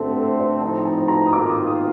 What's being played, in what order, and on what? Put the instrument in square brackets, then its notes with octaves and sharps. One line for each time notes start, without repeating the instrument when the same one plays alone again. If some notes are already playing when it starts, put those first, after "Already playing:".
Already playing: [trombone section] D3 A3 C4 [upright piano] G4 A4
[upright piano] C5
D5
[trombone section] A2 F3 C4 D#4 [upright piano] A5
[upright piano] A5
A#5
D#6
[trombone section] D#3 A#3 F4 [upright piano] D6
[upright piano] D#6
D#6